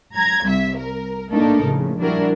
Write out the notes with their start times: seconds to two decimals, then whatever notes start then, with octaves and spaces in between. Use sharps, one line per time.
0.15 A#5 G#6
0.46 C2 E5
0.77 A#4
1.31 A3 A#3 D4 D#4 A4 A#4
1.63 A#1 A2 C#3
2.00 G3 D4 E4 F#4 A#4